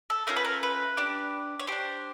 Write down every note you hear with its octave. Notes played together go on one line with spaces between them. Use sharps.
A4
A3 C#4 F4 A#4
B4
A#4
B4
D4 G4
C#5
D4 G4 C5